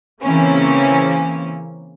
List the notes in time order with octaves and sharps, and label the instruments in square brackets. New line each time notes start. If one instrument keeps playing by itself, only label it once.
[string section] C#3 E3 A#3 C4 C#4